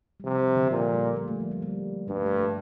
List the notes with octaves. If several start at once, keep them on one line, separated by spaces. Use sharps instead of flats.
G3
C3 F3
F3
D3
A#2 F3
G3
A#3
A3
F3
G3
G3
G2 G3
A3
G3
A3
G3